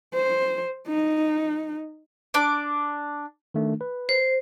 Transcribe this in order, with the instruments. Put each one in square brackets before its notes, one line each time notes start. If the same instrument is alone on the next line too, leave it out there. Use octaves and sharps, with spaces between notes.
[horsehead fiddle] C5
D#4
[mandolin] D4 D6
[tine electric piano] D#3 A3 D4
B4
[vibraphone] C5